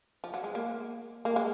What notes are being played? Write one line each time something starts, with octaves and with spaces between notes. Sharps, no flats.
F3
F#3
G#3
A#3
A#3
G#3